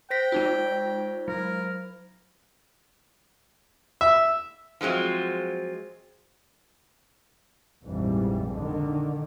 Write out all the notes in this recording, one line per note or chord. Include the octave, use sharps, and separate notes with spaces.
C5 G5 A#6 B6
G#3 D#4 F4
F#3 A#4
E5
F3 F#3 G#3 C4 F4
A#1 F2 G#2 E3 G3
D3 D#3